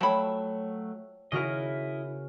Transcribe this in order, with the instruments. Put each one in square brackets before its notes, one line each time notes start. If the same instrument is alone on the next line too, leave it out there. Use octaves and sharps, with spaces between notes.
[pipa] F3 B5 [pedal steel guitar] F#3 A3 [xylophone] C#5 G5 A5
[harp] C#3 F#4 A#4 [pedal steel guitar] E4 D#5